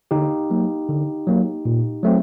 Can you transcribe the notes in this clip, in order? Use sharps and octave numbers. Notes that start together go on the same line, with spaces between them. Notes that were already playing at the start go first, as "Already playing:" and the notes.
D3 D#4 G4
F#3 A#3
D3
F#3 A#3
A#2
F#3 A3 C4